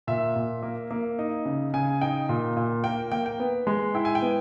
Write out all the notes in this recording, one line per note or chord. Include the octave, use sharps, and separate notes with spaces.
A#2 E5
A#2
A#3
A#3
D#4
C#3
C#3 G#5
D#4 G5
A#2
A#2
A#3 G5
A#3 G5
G5
B3
G#3
E4 G5
G#5
G5
B3